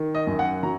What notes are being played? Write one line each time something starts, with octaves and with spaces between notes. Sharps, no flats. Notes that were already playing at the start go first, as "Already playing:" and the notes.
Already playing: D#3
D#5
F#2
F#5
F#3 A#5